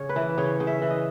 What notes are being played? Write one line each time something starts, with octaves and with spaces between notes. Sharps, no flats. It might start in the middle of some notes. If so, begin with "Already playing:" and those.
Already playing: C#3 C#5
B4
E3
C#3 C#5
C#3
E5
E3
D#5